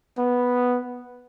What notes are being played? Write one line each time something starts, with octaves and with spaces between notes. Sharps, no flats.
B3